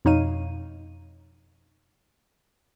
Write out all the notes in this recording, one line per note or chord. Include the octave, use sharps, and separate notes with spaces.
F2 B2 D#4 C#5 F5 D#7